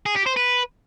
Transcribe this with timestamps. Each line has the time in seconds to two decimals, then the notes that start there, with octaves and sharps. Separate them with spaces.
0.06 G#4
0.16 G4
0.26 C5
0.36 B4